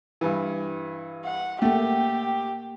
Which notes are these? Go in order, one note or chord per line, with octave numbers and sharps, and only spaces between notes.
G2 E3
F#5
A3 A#3 G4 F#5